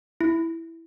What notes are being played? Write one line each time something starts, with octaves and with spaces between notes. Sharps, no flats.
E4